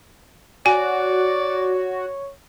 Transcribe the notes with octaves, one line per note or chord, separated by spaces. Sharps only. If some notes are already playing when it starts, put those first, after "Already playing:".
F#4 C#5 D5 G#5